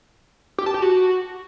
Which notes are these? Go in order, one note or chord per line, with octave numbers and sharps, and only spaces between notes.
G4
A5
G4
F#4